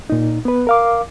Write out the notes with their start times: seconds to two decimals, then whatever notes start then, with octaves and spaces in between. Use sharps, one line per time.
0.10 A#2 D#4
0.45 B3 B4
0.67 A#4 F5 D6